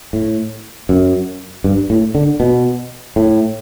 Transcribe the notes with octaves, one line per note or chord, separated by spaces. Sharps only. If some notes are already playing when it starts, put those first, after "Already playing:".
A2
F#2
G2
A2
D3
B2
A2